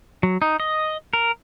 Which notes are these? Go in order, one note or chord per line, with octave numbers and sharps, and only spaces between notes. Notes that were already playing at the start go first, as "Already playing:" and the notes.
F#3
D#4
D#5
A#4